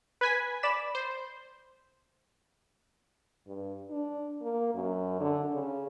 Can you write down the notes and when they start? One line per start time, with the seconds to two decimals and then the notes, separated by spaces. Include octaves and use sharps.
0.21 B4 G#5 B6
0.63 D5 B5 E7
0.95 C5
3.48 G2
3.91 D4
4.43 A#3
4.75 F#2
5.21 D3
5.53 C#3